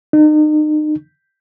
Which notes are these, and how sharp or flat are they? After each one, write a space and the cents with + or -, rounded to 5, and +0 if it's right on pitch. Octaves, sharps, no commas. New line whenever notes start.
D#4 -35